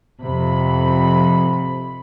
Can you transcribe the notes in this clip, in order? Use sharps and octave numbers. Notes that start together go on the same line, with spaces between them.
F2 C3 B5